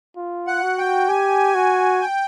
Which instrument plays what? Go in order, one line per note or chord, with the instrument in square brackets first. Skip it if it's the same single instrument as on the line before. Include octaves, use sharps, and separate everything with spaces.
[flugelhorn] F4
[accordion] F#5
[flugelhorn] F#4
[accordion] G5
[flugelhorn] G4 [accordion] G#5
[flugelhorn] F#4
[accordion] G5